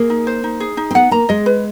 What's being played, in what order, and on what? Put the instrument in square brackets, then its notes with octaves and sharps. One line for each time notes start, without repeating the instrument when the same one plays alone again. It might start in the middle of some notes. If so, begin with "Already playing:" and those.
Already playing: [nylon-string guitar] A#3 [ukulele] G#4
[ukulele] D#4
C5
D#4
G#4
D#4
[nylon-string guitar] C4
[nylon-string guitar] B3 [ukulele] F#5
[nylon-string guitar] A#3 [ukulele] A#5
[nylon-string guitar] G#3 [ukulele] D#5
[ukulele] B4